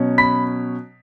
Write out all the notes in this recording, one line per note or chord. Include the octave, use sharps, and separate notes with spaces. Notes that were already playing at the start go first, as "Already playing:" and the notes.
Already playing: B2 F#3 C#4
B5 B6